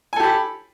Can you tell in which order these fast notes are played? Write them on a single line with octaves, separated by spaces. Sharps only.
G#5 A4 G4 B5